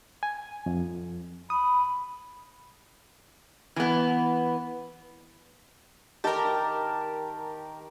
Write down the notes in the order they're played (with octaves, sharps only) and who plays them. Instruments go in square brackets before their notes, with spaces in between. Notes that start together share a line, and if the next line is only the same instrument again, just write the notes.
[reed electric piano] G#5
F2
[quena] B5 [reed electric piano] D#6
[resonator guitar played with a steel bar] E3 B3
[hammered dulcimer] D#3 A5 [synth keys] G4 A#4